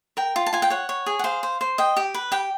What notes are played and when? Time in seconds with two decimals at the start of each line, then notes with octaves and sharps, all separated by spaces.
0.17 A#4 G5
0.36 F4
0.46 A5
0.53 F4 G#5
0.62 G5
0.70 C#5 F#5
0.89 C#5
1.06 G#4
1.19 F#5
1.24 C5 F5
1.43 C5
1.61 C5
1.78 D#5 G5
1.97 G4
2.14 B4
2.32 G4 G5